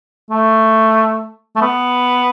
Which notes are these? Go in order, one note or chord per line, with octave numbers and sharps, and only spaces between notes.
A3
A3
B3